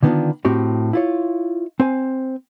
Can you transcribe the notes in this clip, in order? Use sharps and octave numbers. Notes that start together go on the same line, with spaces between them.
D3 D#3 B3 C#4 D4 F4
A2 C4 F#4 G4
E4 F4 C#5
C4 C5 G#5